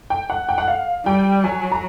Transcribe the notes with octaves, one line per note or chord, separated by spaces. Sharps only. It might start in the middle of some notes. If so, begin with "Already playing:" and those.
G5
F#5
G5
F#5
F5
G3 G5
F#3 G#5
A#5